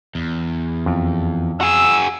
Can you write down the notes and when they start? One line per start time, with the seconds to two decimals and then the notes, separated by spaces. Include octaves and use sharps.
0.15 E2
0.86 F2
1.61 F#4 G#4 E6